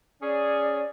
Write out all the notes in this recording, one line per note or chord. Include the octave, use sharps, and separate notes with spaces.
C#4 G#4 D5